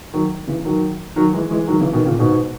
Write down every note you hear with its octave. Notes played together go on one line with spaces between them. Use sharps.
D#3 F#3
C#3 E3
D#3 F#3
D#3 F#3
E3 G#3
E3 G#3
D#3 F#3
C#3 E3
B2 D#3
A#2 C#3
G#2 B2